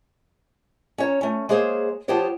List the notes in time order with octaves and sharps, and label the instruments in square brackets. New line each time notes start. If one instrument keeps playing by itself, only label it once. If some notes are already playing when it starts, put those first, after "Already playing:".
[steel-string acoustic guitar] C#4 C#5 A#5
A3 C#4
G#3 A#3 G#4 C5 C#5
F3 B3 F4 G4 C5 C#5